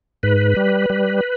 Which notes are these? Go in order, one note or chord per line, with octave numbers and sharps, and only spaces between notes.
G#2 B4
G3
G3